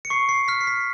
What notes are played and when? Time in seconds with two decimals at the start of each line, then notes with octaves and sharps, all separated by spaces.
0.05 C#7
0.10 C#6 C7
0.29 C7
0.48 F6 B6
0.61 C7
0.67 B6